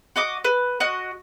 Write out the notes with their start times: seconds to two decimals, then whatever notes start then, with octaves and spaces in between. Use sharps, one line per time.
0.16 F#4 D#5 D6 D#6
0.44 B4
0.80 F#4 D#5 F#6